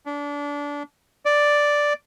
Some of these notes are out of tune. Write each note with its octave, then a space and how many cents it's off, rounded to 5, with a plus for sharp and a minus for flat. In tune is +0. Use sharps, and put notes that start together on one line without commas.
D4 -25
D5 +0